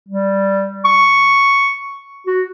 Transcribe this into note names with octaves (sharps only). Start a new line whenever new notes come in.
G3
C#6
F#4